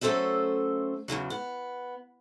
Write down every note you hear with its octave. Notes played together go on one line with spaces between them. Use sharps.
F#3 A3 C#4 A4 C5 E5
E2 A2 C#3 F#3
B3